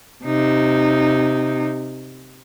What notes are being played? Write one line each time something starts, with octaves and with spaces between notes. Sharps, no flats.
C3 D#4